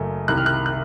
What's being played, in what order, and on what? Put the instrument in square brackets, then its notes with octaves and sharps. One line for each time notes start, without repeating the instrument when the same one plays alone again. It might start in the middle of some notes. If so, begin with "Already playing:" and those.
Already playing: [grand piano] F#1 F#2 C#3 A3
C2 C3 D#3 F#6
F6
F#6
F#6